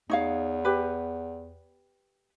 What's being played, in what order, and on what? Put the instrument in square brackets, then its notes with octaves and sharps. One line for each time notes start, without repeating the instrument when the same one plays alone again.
[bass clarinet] E2 [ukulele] D#4 C#5 F5
[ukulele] G4 B4